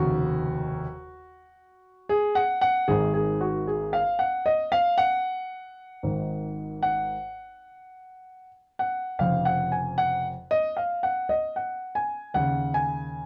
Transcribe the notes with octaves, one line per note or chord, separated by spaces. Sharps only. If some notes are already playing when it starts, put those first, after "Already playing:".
Already playing: F1 D#2 C#3 F#4
G#4
F#5
F#5
G#1 G#2 D#3 G#4
G#4
F#4
G#4
F5
F#5
D#5
F5
F#5
G#1 G#2 D#3
F#5
F#5
F1 F2 C#3 F5
F#5
G#5
F#5
D#5
F5
F#5
D#5
F#5
G#5
D#2 C#3 F#5
G#5